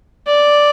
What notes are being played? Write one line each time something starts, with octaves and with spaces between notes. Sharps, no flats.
D5